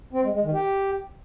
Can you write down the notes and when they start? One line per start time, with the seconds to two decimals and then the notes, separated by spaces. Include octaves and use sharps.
0.13 C4
0.23 G#3
0.33 G#3
0.43 D#3
0.53 G4